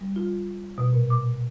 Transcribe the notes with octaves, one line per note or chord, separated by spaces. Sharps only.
G3
F4
B2
A#2
D6